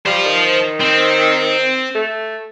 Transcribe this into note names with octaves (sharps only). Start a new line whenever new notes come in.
G3 C5 F5
D#3
C4
A3